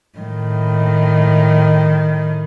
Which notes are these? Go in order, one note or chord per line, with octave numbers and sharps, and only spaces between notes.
A2 D#3